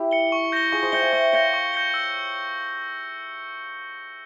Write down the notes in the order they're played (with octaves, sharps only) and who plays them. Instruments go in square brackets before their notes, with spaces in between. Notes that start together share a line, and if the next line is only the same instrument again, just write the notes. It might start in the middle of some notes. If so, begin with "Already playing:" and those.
Already playing: [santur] E4 G4
[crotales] C#7 G7
C#6
G6 A#6 C#7 G7
[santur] F4 G#4 [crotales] C#6
[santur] G#4 C5
[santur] E5 G5 [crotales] G6 A#6 C#7 G7
[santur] F5 G#5
[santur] E5 G5 [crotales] C#6
[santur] C#5 F5 [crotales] G6 A#6 C#7 G7
[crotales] C#6
G6 A#6 C#7 G7
E6